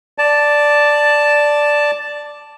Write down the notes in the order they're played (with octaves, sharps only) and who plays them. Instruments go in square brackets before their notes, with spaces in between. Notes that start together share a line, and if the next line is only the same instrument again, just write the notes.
[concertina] D5 A5